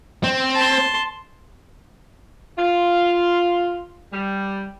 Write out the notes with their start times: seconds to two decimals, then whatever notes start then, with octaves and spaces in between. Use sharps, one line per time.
0.24 C4
0.55 A5 C6
2.58 F4
4.13 G3